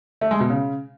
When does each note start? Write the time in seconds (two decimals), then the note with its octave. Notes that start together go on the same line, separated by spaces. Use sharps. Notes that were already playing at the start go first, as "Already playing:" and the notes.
0.21 A3
0.31 G#3
0.40 B2
0.50 C#3